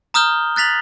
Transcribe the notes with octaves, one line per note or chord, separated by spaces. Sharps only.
A#5 D#6 F6 G6 G7
F#6 A6 B6 F7 F#7